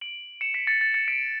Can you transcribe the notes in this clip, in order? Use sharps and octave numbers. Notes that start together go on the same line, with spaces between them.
D7 F#7
C#7 E7
B6 D7
A6 C#7
A6
A6 C#7
B6 D7